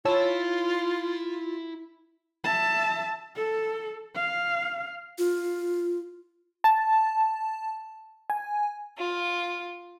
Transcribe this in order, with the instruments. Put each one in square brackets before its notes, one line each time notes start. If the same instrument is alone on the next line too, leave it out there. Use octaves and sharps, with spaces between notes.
[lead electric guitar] E4 B5 [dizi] F4 [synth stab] C#5 A5 E6
[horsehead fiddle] E5 A5
A4
F5
[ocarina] F4
[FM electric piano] A5
G#5
[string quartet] F4